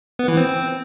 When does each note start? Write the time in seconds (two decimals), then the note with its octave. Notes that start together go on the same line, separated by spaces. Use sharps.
0.19 B3
0.28 E3
0.37 C4